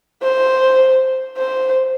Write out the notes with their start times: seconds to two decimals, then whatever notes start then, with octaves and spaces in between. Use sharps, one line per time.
0.23 C5
1.38 C5